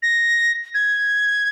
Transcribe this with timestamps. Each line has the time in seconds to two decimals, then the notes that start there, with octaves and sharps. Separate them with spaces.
0.03 A#6
0.74 G#6